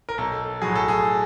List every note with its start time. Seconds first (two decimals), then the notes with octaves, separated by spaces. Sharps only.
0.09 A#4
0.18 B1 A4
0.62 A2 F#3 G#4
0.75 A4
0.88 G#4